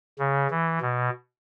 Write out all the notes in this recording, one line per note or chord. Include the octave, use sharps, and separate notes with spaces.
C#3
E3
B2